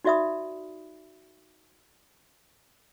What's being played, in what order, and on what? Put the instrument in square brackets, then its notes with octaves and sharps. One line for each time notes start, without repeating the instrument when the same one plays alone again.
[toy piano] D#4 F#4 D5 E5 B5 D#6